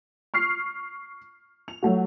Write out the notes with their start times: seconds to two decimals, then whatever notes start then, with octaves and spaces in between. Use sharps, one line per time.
0.34 C#6 F6 C7
1.68 F7
1.83 F#3 A3 F#4